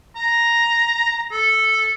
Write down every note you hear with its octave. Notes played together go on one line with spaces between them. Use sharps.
A#5
A4